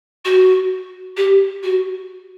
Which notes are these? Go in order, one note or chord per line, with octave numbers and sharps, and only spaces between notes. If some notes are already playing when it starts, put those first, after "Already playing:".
F#4
G4
F#4